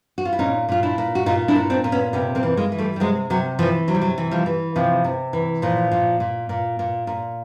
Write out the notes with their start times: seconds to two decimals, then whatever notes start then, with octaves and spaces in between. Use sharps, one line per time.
0.18 F#4
0.25 F4
0.33 E4
0.39 A#2 C#4 D#4
0.69 A#2 F4
0.83 D4 E4
0.98 A#2
1.15 F#4
1.26 A#2 D#4 F4
1.48 D4 E4
1.55 A#2
1.70 C4 D4
1.84 A#2
1.92 B3 C#4
2.13 C3 B3 C#4
2.35 A#3 C4
2.43 E3
2.57 G#3 A#3
2.72 E3
2.78 G3 A3
2.96 G3
3.00 C3 F#3 G#3
3.30 C3 F#3
3.59 E3 F3
3.88 C3 F#3
3.95 G3
4.01 F#3
4.18 E3
4.31 F3 G3
4.46 E3
4.76 C3 F3
5.04 C3
5.33 E3
5.62 A#2 F3
5.92 A#2
6.20 A#2
6.49 A#2
6.79 A#2
7.07 A#2